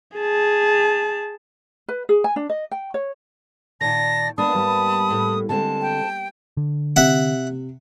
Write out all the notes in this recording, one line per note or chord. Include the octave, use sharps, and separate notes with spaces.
G#4 A5
B4
G#4
G#5
D4
D#5
G5
C#5
A#2 D#3 D5 A5 A#6
G#3 A#3 B3 D4 A5 B5 D#6
G#2 G3
A2
D3 G#3 C4 A5
G5
D3
C3 E5 F#5